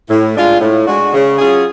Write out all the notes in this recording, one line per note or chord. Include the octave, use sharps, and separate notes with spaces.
A2
G#3 D4 F4
A2
G#3 D4 F#4
C#3
F#3 C#4 F4 G#4